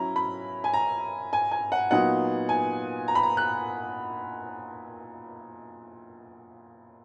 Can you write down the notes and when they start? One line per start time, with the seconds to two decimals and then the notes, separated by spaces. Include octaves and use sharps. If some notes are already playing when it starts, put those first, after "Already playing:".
Already playing: F#3 C#4 E4 A#5
0.16 B5
0.64 G#5
0.74 A#5
1.33 G#5
1.51 G#5
1.72 F#5
1.91 A#2 F#3 B3 D#4 F#5
2.49 G#5
3.08 A#5
3.15 B5
3.23 A#5
3.37 F#6